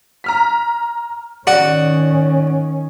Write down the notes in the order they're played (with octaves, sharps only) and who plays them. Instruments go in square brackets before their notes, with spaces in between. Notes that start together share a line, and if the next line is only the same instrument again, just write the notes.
[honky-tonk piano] A#5 F6 B6
[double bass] D#3 C#4 [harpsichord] F#4 [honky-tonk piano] D5